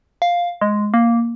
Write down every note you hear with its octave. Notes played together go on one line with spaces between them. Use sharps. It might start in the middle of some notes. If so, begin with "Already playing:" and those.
F5
G#3
A#3